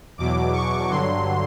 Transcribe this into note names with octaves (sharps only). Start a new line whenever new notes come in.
E2 B2 F#3 D6
C#6
G2 D3 F#3 C6